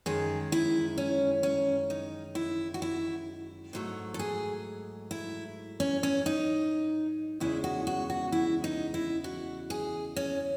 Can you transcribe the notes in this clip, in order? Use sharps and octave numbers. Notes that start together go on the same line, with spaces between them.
F#2 D#3 G#3 G#4
E4
C#4
C#4
D#4
E4
F#4
E4
G#2 F#3 A3
A4
G#4
E4
C#4
C#4
D#4
E2 C#3 G#3 E4
F#4
F#4
F#4
E4
D#4
E4
F#4
G#4
C#4